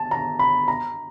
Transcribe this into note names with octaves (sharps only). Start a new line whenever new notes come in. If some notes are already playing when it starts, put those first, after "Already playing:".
Already playing: A5
A#5
B5
A#5